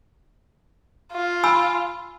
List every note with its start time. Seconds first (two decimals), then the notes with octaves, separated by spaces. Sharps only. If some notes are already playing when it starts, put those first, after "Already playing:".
1.13 F4
1.44 G#5 B5 E6